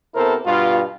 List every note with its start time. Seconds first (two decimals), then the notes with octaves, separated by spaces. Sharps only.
0.14 C3 B3 E4 A4 A#4 C5
0.46 G2 B2 F4